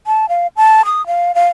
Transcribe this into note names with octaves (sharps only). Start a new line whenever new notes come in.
A5
F5
A5
D#6
F5
F5